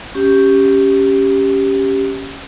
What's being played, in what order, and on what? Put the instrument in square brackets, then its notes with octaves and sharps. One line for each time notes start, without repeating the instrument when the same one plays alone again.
[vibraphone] C#4 G4